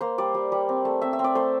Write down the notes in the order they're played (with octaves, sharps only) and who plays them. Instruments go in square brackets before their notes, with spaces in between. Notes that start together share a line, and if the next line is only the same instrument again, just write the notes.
[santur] A#3 C5
G3 D5
G3
G3
C4
A3
C4 E5
E5
C4
D5
A3 C5